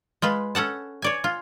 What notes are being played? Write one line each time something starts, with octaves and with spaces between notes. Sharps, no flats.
G#3 F4 B4
C#4 A4 F#5 A5
C#5 D5 G#5
F4